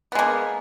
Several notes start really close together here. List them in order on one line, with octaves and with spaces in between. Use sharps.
B3 G#3 A#3